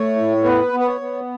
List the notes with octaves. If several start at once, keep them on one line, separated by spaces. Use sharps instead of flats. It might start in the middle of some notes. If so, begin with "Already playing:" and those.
Already playing: A3 C#5
A2
B3 B4
B3
B4
C#5
B3